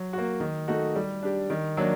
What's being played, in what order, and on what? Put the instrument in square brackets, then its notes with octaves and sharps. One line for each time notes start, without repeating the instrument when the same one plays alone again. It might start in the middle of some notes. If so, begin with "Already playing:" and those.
Already playing: [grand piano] F#3
A#3 F#4
D#3
A3 D#4 F#4
G3
D4 G4
D#3
F#3 A#3 D4